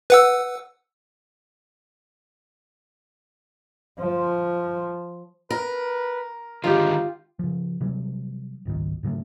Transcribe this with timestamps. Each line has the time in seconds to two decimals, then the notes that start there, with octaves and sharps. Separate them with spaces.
0.10 B4 F#5 E6
4.00 F3
5.51 A#4 B4
6.64 D3 D#3 G#3 D#4 F4 G4
7.39 C#3 F3
7.81 C3 E3 F#3 G3
8.65 G#1 C#2 G#2 D#3
9.03 G#2 C#3 F#3 A3